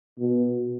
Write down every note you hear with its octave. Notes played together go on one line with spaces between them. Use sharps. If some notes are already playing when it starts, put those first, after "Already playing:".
B2